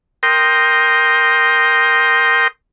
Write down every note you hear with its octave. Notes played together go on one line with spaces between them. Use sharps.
A#4 G5 C6 D#6